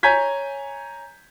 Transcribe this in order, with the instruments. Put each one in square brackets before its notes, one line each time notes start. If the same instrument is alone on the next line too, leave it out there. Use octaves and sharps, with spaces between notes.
[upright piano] C#5 G#5 A#5 G6 G#6 B6